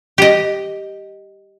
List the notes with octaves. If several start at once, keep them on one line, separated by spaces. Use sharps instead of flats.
G4 D#5